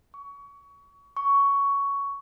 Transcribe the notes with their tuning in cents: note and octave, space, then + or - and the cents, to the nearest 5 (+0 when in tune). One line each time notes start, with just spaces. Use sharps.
C#6 +25
C#6 +10